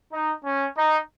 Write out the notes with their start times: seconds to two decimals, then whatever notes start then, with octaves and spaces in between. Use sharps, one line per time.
0.12 D#4
0.44 C#4
0.77 D#4